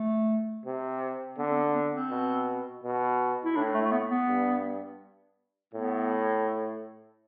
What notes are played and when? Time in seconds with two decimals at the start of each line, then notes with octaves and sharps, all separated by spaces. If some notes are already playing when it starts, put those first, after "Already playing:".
Already playing: A3
0.65 C3
1.38 D3 B3
1.50 C4
1.56 B3
1.75 B3
1.93 C4
2.10 B2
2.83 B2
3.45 E4
3.56 A2 D4
3.74 A3
3.85 A3
3.92 B3
4.10 B3
4.28 G2
5.73 A2 B3